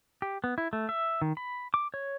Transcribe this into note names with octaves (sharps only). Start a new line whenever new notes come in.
G4
B3
E4
A3
E5
D#3
B5
D6
C#5